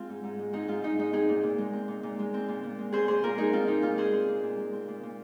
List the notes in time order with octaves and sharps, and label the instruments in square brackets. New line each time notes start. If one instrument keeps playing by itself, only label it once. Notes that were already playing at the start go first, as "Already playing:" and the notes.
Already playing: [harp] G#3 C4 F4
G#2
G#2
G#3
C4 D#4 G#4
G#2 F4
G#2 D#4
G#3 D#4
C4 D#4 G#4
A#2
A#2
G#3
C4
A#2
A#2
G#3
C4
A#2
A#2
G#3
C4 G#4 C5
A#2 G#4 C5
A#2 F4 A#4
G#3 D#4 G#4
C4 F4
A#2 D#4
A#2 F4
G#3 G#4 C5
C4
A#2
A#2
G#3
C4
A#2
A#2